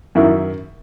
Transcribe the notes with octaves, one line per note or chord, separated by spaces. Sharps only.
F#2 D#3 E4